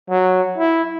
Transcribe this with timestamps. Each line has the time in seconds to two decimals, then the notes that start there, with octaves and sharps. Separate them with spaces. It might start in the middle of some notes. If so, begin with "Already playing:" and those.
0.10 F#3
0.58 E4